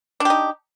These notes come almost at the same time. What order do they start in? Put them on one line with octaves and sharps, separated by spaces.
D4 G4 D#4